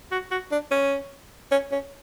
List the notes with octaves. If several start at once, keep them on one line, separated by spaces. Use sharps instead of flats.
F#4
F#4
D4
C#4
C#4
C#4